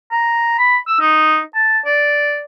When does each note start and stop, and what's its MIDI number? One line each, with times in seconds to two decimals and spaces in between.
0.11 0.58 82
0.58 0.77 83
0.87 0.98 88
1.00 1.41 63
1.55 1.79 81
1.86 2.42 74